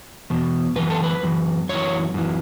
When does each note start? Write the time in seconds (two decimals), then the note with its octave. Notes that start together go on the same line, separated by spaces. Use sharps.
0.30 E2 B2
0.76 F#2 E3 B4
0.90 A4
1.03 B4
1.23 F#2 E3
1.69 F#2 E3 C#5
2.14 F#2 E3